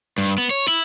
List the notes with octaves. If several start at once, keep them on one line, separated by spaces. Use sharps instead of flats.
G2
B3
C#5
E4